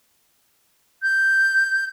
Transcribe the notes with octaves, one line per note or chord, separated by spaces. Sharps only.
G6